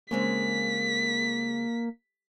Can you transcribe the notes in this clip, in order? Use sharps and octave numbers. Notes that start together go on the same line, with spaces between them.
C#3 G#3 A#3 C4 B6